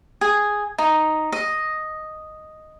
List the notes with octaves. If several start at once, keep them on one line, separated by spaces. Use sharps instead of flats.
G#4
D#4
D#5